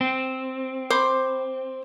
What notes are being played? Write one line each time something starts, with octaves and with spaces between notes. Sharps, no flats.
C4
C5 B5 D6